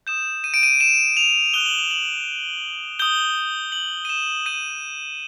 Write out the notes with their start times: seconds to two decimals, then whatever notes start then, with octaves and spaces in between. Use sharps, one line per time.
0.07 D#6 G6 E7
0.44 D#7
0.54 D7
0.63 D#7
0.80 E7
1.17 F7
1.54 D#6 F#6 G7
1.66 F#7
1.78 F7
1.91 F#7
2.99 D#6 G6 G7
3.72 F#7
4.05 D#7
4.09 E7
4.46 D#6 G6 D#7